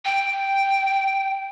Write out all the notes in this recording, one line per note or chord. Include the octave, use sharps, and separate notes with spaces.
G5